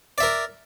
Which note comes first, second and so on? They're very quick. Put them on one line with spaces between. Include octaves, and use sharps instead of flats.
D5 E5 A#4